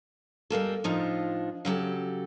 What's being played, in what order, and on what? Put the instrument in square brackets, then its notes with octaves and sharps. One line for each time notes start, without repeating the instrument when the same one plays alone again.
[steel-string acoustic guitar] G3 G#3 A#3 A4
A2 F3 D4 D#4 F4
C#3 F#3 G4 A4